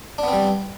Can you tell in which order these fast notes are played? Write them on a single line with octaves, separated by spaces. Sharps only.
D4 B3 C4 G3